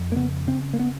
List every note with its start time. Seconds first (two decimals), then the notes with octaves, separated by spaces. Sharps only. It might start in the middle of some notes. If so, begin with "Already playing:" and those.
Already playing: F2
0.12 A#3
0.16 C#3 B3
0.47 C#3 C4
0.73 A#3
0.79 B3